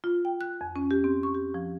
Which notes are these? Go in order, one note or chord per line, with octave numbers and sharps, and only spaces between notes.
F4
G5
F#6
F2
C#4
G4
C4
C#6
G4
F3